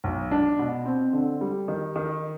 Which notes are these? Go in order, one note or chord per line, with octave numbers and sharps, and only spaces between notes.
B1
D4
B2
C4
D3
G3
D#3
D#3